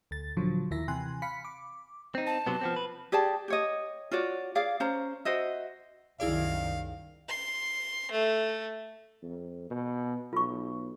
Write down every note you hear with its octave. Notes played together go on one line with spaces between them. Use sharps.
D2 A6
A#2 D3 F3 F#3
D#2 D#3 E4 E5 A#6
C3 E3 G#5 C6 F#6
F5 B5 B6 C#7
D6
C4 D#4
A5
C3 F#3 B3
F3 B3 C4
B4
G4 G#4 D5 A5
G4 C#5 D#5
F4 F#4 C#5 D5
G#4 D5 F5
C#4 C5 A#5
F#4 C5 D#5 E5
C2 F#2 D#3 E4 G#4 D5 F5
C6
A3
F2
B2
B1 F4 C#6